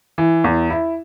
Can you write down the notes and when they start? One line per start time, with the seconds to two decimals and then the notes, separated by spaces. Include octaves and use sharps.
0.18 E3
0.44 E2
0.70 E4